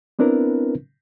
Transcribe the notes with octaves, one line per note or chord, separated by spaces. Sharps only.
B3 C4 D4 E4 A#4 B4